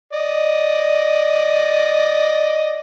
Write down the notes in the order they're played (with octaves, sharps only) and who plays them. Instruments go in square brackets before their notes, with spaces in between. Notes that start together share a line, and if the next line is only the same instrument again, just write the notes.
[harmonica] D5 D#5